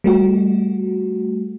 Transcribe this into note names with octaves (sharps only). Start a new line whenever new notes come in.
G3 A3 F#4